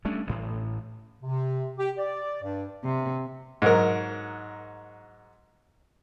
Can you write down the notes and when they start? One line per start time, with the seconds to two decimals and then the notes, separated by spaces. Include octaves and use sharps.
0.05 G3 A3 C#4 D4
0.27 A1 A2
1.23 C3
1.78 G4
1.98 D5
2.43 G2
2.84 C3
3.62 G#2 F#3 A#4